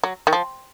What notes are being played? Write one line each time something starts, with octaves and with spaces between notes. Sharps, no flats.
F#3
D#3
F3